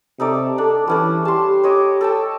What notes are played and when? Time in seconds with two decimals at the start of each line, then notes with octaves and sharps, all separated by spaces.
0.20 C3 D#4 A4 D5
0.58 D4 A4
0.87 E3 G3 C#4 D4
1.25 G4 A5 C6
1.63 C#5 D#5 D6
2.01 A4 G5 A5